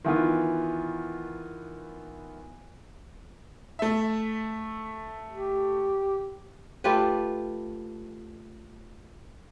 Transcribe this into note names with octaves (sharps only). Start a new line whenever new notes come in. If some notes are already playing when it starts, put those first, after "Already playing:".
D#3 E3 B3 F4
A3 E5
G4
A3 F4 G4 B4